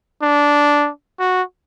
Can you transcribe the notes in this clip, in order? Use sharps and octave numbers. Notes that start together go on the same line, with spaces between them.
D4
F#4